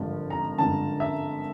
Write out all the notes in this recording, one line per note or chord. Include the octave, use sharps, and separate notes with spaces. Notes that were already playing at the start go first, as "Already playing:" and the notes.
Already playing: G#1 G2 D3 F3
A#5
G#1 G2 D3 F3 A5
E5